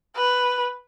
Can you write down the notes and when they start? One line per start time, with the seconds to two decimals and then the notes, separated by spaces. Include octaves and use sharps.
0.16 B4